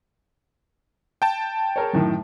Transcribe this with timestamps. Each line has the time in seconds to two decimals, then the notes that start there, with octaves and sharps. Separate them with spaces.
1.22 G5 A5
1.76 G#4 A#4 C#5
1.93 F#2 A2 D#3